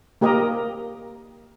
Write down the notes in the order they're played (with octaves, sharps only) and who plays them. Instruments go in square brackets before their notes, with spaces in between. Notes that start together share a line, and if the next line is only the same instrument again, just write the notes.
[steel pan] A#3 G4 A#4 D#5 A#5